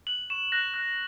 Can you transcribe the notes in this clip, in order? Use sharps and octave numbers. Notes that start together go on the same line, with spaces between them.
F#6 F#7
C#6 E7
F#6 A#6
F#6